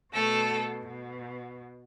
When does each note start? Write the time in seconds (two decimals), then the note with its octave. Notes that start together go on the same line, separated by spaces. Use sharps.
0.13 B2 A3 A4
0.86 B2